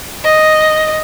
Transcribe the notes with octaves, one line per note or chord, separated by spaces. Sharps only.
D#5